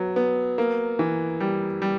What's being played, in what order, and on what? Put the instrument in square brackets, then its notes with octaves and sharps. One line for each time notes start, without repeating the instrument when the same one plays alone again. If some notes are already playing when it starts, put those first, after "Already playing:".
Already playing: [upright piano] F#3 B3
B3
A#3
E3
G3
G3